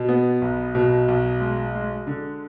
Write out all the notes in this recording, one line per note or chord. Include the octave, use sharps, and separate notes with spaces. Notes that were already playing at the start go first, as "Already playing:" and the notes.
Already playing: B2
B3
B1
B2
B1
G#3
G#3
D3